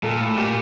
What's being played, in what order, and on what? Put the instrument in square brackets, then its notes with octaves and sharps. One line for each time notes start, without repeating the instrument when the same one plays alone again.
[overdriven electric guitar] A#2 [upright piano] A4
[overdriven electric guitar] A2
[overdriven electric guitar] A#2 [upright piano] G4